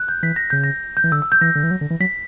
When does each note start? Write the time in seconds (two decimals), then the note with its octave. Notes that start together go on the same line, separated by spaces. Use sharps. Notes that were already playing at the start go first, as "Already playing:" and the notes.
Already playing: F#6
0.08 G6
0.23 E3 B6
0.36 A#6
0.50 C#3 G6
0.64 A#6
0.97 G6
1.04 E3
1.12 D3 E6
1.22 E6
1.32 G6
1.41 E3 A#6
1.55 D3
1.63 E3
1.71 F#3
1.81 D3
1.90 E3
2.00 F#3 B6